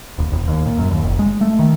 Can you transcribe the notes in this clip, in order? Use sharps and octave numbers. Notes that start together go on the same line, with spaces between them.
D#1
E1
D#2
A#2
F#2
D#2
F#1
G#3
A3
D#3